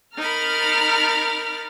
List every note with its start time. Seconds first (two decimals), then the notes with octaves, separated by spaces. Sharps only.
0.17 D#4 A#4 A#5 B5 F6 A6